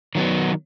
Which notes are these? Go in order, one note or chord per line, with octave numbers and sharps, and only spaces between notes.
D#3 F#3 B3